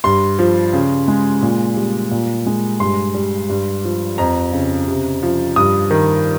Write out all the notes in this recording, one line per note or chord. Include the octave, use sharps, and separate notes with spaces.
G2 C6
F3
C#3
G#3
A#2
G3
A#2
G#3
G2 C6
G3
G2
F3
F2 A#5
C#3
C3
F3
G2 D#6
D#3